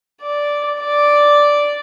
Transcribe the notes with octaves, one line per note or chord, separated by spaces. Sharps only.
D5
D5